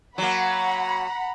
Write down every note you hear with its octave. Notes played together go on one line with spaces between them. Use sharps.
F#3 A#3 F#5 A#5 B5